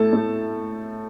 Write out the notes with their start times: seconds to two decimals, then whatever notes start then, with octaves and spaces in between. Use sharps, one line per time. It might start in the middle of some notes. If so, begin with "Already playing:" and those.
Already playing: A2 A3 A4 A5
0.13 A2 A3